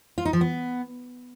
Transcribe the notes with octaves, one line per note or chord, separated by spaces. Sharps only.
F4
D#4
F3
B3